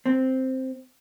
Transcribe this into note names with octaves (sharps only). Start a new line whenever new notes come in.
C4